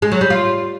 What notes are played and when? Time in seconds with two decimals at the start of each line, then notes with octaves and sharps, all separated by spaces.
0.02 G#3
0.12 F#3
0.21 G3
0.30 F4